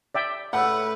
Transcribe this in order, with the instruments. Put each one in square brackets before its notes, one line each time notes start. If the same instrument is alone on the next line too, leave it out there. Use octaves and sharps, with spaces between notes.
[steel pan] D5 E5 G5
[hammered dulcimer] A2 [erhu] B4 [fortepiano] F#5